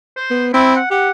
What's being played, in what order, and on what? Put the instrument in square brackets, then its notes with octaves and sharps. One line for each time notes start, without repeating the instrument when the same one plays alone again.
[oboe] C5
[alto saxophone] B3
[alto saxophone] C4 [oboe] E4
[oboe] F#5
[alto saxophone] G4 [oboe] F#5